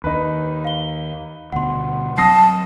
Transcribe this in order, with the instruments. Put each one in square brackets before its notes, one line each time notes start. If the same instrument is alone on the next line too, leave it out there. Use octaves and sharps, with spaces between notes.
[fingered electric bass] D#2 [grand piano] D#4 B4
[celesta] F5 G7
[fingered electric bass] D2 B2 [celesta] F#5 C6
[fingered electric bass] F#3 C4 [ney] A5 [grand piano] D#6 A#6 C7